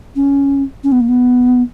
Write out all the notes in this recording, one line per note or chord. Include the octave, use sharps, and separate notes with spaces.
C#4
C#4
B3
A#3
B3